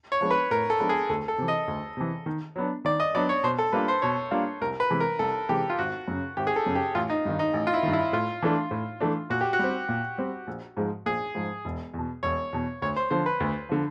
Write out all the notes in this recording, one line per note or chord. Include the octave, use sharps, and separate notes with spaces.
C#5
F3 G#3 B3 D4
B4
A2 A#4
A4
F3 G#3 B3 D4
G#4
D2 A4
A4
C3 E3
D#5
D2
C3 E3
D#3
F#3 B3 D4
D#3 D5
D#5
F#3 B3 D4 D5
C#5
B2 C5
A4
G3 A#3 D4 F4 B4
C5
B2 C#5
G3 A#3 D4 F4
C2 A#4
B4
C3 E3 G#3
A#4
C2 A4
C3 E3 G#3 G4
F4
G#1 F#4
F#2 C#3
G#1 G4
G#4
A4
F#2 C#3
G4
A1 F4
D#4
G2 D#3
D#4
A1
F4
E4
G2 D#3
E4
A2 F4
E3 A3 D4
A2
E3 A3 D4
A#2 F#4
G4
F#4
G3 C4
A#2
G3 C4
A#1
G#2 F3 G#3
A#1 G#4
G#2 F3 G#3
E1
E2 B2
E1 C#5
E2 B2
D2 C#5
C5
D3 F3 C5
B4
D2
D3 F3